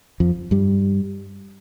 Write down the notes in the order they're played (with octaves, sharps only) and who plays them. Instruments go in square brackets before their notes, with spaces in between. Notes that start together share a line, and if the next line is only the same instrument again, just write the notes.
[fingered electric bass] F2 F3
G2 G3